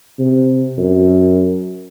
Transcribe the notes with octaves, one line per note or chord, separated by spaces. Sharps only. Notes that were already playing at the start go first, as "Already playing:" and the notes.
C3
F#2